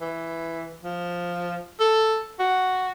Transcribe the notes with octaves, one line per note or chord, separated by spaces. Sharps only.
E3
F3
A4
F#4